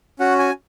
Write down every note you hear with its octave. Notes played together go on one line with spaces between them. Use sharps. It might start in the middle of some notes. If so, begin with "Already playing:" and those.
C#4 F#4 F#5
G#5